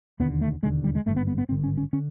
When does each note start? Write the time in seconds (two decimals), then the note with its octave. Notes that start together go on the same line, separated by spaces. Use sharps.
0.20 E1 D#2 D3 B3
0.41 A3
0.63 E1 D#2 D3 G#3
0.84 G3
0.95 G#3
1.06 G#1 G2 D3 A3
1.16 B3
1.27 B3
1.38 B3
1.49 G#1 G2 D3 C4
1.64 C#4
1.77 C#4
1.93 D3 C#4